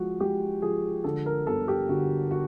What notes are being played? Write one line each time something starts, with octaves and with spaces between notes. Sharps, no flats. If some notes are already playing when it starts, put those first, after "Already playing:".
Already playing: F3 G#3 F#4
G#3 G4
F3 G#4
D3 A4
A#4
G1 A4
G4
D3 F#4
F#4